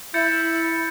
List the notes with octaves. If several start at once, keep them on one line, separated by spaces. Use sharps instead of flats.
E4 G6 A6 C#7